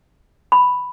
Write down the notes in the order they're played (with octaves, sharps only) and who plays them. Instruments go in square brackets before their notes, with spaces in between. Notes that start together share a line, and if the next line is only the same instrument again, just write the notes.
[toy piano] B5